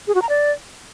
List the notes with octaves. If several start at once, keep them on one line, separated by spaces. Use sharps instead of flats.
G#4
F#4
A#5
D5